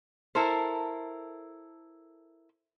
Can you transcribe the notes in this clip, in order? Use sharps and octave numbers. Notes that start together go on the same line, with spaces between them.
E4 A4 A#4 C5